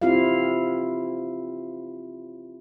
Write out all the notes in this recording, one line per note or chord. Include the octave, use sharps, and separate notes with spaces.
C4 E4 F4 G4 F5